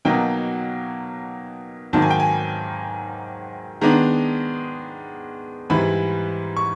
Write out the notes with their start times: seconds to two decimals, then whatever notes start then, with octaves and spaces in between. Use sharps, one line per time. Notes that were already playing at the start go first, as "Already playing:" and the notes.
0.05 B2 F#3 A#3 D#4 G5
1.93 G#2 D#3 F#3 A#3 A5
2.02 G#5
2.10 G5
2.20 G#5
3.81 D#3 G#3 B3 D4 A#5
5.70 G#2 E3 G3 B5
6.57 C#6